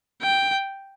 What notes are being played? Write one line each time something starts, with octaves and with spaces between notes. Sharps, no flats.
G5